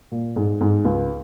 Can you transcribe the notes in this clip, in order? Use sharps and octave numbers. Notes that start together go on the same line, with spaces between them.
A#2
G#2
G#2
C#2